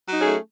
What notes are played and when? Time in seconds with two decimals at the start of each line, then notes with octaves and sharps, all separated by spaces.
0.09 F#3
0.13 D#4
0.18 C#4
0.22 G#4
0.26 A3